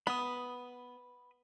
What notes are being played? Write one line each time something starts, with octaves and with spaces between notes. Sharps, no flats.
B3 B5 D#6